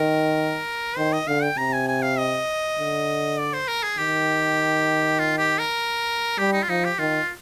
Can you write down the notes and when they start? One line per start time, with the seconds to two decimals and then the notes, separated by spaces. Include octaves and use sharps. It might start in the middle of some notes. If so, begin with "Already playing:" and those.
Already playing: D#3 A#4
0.97 D#3 C5
1.13 D#5
1.27 D3 F5
1.43 G5
1.57 C3 A#5
1.73 G#5
1.88 G#5
2.02 F5
2.18 D#5
2.79 D3
3.38 D5
3.53 C5
3.68 A#4
3.83 G#4
3.98 D#3 G4
5.19 F4
5.38 G4
5.59 A#4
6.38 G3 G4
6.53 D#4
6.63 F4
6.69 F3 D#4
6.84 G4
6.98 D#3 F4